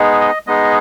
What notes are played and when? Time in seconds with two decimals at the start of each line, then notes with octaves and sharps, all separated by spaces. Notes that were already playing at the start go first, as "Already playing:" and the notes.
Already playing: G#3 B3 D#4 G#4
0.20 D#5
0.47 G#3 B3 D#4 G#4 D#5